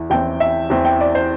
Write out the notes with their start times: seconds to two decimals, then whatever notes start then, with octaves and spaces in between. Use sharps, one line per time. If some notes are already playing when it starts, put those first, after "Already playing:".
Already playing: E2 E3
0.10 E2 E3 C4 G5
0.40 E5
0.70 E2 E3 C4
0.85 G5
1.01 D5
1.15 C5